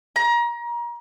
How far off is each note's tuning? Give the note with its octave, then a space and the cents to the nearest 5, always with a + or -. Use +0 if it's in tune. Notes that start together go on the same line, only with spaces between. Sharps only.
A#5 +30